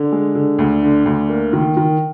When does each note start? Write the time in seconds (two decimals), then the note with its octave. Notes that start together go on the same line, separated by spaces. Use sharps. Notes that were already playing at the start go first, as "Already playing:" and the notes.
Already playing: D3
0.12 G#3
0.35 D3
0.59 D2
0.83 D3
1.06 D2
1.29 A#3
1.53 D#3
1.77 D#3